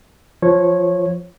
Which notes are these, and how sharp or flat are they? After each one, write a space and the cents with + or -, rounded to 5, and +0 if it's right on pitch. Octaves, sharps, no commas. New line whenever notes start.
F3 +0 C#5 -15